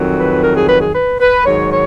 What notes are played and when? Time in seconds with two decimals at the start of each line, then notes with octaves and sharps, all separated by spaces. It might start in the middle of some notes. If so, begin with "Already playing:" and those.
Already playing: F2 D#3 F#3
0.18 B4
0.43 A#4
0.56 G#4
0.68 B4
0.81 G#4
0.95 B4
1.20 B4
1.44 G#2 D#3 F#3 C#5
1.71 C#5